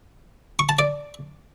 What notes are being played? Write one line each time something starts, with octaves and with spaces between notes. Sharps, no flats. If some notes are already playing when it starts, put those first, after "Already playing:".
C#6
A5
D5